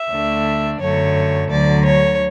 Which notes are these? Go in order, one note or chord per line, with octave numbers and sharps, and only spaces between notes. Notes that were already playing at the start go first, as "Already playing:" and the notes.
Already playing: E5
D2 D3 A3 D4
F#2 D3 F#3 A3 C#5
D2 D3 F#3 D5
C#5